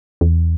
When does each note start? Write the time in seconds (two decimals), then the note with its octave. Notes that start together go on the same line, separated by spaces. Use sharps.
0.21 E2